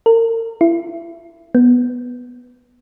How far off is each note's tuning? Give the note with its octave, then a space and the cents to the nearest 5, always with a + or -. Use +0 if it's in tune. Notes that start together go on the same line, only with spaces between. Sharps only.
A#4 -35
E4 +30
B3 +0